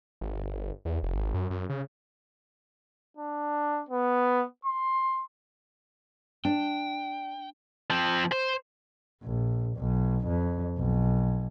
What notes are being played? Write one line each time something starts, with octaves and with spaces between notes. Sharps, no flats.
G#1
G1
E2
F1
G#1
F#2
F#2
C#3
D4
B3
C6
D4 G5
F3 C4
C5
A#1
B1
F2
B1